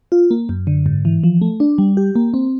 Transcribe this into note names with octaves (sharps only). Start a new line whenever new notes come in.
F4
A#3
F#2
D3
G#2
E3
F3
A3
D4
G3
G4
A#3
C4